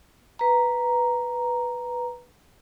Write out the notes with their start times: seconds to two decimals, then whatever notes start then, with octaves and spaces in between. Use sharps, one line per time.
0.39 B4 A#5